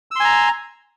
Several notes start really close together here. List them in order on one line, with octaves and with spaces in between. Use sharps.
E6 C6 G#5 A#5